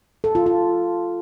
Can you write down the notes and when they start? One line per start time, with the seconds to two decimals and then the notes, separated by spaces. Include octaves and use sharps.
0.24 A4
0.35 F4
0.46 F4